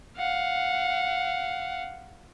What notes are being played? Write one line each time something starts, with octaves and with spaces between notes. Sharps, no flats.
F5 F#5